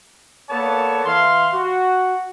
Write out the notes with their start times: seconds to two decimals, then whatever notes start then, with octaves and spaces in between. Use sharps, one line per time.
0.50 A#3 B3 A4 C#5 D5 A5
1.05 E3 E5 F5 C6
1.53 F#4